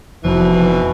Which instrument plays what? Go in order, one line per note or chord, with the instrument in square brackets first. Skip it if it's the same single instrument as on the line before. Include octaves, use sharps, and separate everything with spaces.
[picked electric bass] F1 [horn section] B2 E3 [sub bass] F3